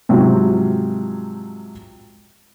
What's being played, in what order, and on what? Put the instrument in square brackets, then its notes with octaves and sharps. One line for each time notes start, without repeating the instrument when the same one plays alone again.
[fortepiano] G#2 C3 F3 F#3